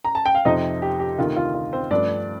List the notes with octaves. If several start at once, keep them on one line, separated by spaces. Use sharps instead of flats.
A#5
A5
G5
F5
F2 C3 F3 C4 D#4 D#5
G4
G4
D2 C3 D#3 F4
F4
F4
C4 C5
G2 F3 A3 D4 D5